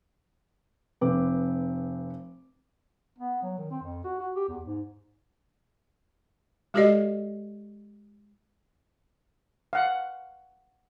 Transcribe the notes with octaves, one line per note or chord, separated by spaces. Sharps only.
F1 C4 B4 D6
B3
F#3
D#3
C4
F2
F#4
F#4
G4
E2
G#2
G#3 F#4 G4 A4 D5 D#5
F5 F#5